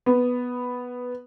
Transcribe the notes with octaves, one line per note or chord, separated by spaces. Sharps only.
B3